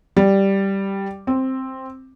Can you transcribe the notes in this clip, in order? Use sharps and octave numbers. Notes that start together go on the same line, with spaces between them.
G3
C4